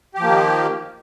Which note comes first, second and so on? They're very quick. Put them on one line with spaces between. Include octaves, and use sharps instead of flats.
G4 F3 A#3 D#3